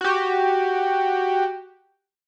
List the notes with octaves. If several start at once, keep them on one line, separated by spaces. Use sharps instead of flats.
F#4 G4